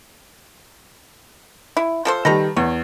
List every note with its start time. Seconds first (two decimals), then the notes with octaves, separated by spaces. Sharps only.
1.77 E4
2.05 F3 A4 C5
2.25 D#3 G3 A4 B4 A#5
2.57 E2 C#5